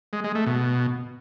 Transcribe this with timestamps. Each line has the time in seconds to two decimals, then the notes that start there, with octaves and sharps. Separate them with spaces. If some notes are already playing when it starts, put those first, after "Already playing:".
0.13 G#3
0.24 G#3
0.35 A3
0.46 B2